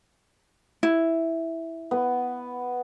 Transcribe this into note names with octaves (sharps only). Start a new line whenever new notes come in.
E4
B3